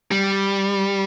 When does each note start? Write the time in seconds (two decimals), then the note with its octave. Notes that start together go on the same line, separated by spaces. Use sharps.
0.12 G3